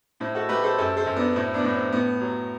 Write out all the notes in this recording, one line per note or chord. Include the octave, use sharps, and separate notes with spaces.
A2 C4 E4
F#4 A4
A3 G4 B4
A4 C5
F#2 A4 C5
A4 C5
F#2
B3 D4
A2 C4 E4
B3 D4
A2
C4
A2 B3
F#3